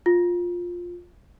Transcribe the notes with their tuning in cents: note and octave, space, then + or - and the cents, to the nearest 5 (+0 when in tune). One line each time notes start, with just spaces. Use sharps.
F4 +10